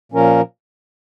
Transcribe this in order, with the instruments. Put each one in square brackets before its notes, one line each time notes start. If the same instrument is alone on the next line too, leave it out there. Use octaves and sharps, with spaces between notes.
[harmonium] A#2 F3 C#4 A#4